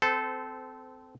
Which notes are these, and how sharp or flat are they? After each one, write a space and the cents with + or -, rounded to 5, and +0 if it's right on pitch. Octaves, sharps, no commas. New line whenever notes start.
C4 -25 A4 -15 C5 -35